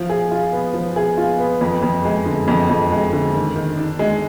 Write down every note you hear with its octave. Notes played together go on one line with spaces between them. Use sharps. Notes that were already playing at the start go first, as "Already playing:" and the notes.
Already playing: F3
G#4
F4
B3
F3
G#4
F4
B3
F2
F2
G#3
D3
F2
F2
G#3
D3
D#3
D#3
D4
G#3